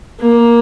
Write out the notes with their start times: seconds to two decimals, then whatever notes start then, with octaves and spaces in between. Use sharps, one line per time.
0.20 A#3